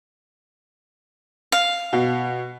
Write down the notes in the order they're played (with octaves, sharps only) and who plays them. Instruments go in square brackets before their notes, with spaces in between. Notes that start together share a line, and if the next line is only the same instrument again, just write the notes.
[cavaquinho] F5
[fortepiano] B2